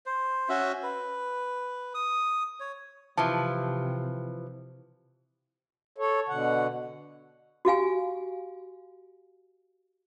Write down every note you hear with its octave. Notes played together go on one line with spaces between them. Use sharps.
C5
C#4 F#4 E5
B4
D#6
C#5
C3 E3 F3 A5
A4 C#5
B2 D3 F#5
F#4 G4 F5 G#5